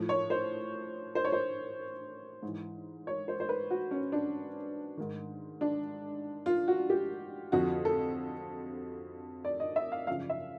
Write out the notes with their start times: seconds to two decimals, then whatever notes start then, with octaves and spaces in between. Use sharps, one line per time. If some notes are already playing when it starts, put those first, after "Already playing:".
Already playing: A2 F3
0.09 C#5
0.30 C5
1.15 C5
1.24 C#5
1.32 C5
2.43 G#2
2.48 E3
3.07 C#5
3.28 C5
3.40 C5
3.49 B4
3.70 F#4
3.91 C#4
4.12 D4
4.97 G#2 D#3
5.61 D4
6.46 F4
6.68 F#4
6.90 G4
7.52 F2 D3 F3 F#4
7.85 A4
9.45 D5
9.60 D#5
9.76 E5
9.92 F5
10.07 F#2 C#3 F3 F5
10.30 E5